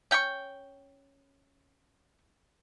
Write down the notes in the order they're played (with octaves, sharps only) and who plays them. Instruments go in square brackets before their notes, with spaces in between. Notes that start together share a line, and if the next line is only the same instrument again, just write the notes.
[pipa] C#4 G5 B5 C#6